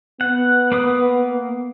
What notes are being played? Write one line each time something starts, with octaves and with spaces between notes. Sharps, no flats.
B3 F#5
A#3 B4 D#6